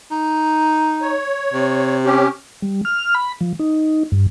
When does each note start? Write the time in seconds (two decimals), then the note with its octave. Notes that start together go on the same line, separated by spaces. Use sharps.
0.11 D#4
1.02 C#5
1.53 C3
2.05 C#4 G4
2.62 G3
2.85 F6
3.15 B5
3.41 F3
3.59 D#4
4.12 G2